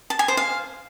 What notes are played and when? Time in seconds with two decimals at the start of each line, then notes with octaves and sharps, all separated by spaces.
0.10 A5
0.19 G#5
0.28 C5
0.37 F5